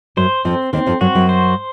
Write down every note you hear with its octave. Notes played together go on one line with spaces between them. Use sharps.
F#2 F#3 C5
F2 F3 C4
D#2 D#3 C4
F2 F3
F#2 F#3 F#4
F#2 F#3
C5